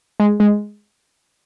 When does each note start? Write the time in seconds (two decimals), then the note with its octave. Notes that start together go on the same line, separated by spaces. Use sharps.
0.20 G#3
0.40 G#3